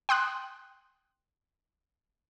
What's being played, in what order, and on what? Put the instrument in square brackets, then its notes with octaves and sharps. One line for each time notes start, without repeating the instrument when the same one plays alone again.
[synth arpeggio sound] G5 C6 D#6 F#6